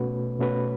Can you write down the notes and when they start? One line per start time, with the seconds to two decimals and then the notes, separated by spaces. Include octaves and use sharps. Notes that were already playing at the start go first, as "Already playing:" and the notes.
Already playing: B2 A3 C#4 F#4 B4
0.39 B2 A3 C#4 F#4 B4